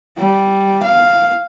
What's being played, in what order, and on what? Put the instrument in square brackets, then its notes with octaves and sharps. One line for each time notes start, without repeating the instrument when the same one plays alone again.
[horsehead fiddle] G3
F5